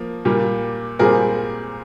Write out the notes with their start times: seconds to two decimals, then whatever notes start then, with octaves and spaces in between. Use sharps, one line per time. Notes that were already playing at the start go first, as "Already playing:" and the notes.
Already playing: F3 A#3
0.25 A#2 G3 A#3
0.99 A#2 G3 C4 G#4 A#4